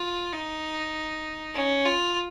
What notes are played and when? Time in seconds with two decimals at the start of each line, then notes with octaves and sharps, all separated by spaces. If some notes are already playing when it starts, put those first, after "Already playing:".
Already playing: F4
0.33 D#4
1.54 C#4
1.85 F4